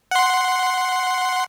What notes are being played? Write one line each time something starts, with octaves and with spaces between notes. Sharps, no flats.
F#5 C6